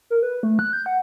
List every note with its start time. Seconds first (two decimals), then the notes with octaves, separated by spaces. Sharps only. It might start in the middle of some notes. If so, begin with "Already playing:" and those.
0.10 A#4
0.23 B4
0.43 A3
0.59 F#6
0.73 G6
0.86 F#5